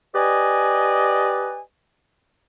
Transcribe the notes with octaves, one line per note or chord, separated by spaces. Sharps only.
G4 B4 D5 D#5 G#5